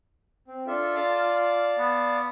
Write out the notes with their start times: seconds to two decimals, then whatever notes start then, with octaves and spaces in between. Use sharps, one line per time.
0.48 C4
0.67 D4 F4 A4 E5
0.95 D5 F5 A5
1.78 B3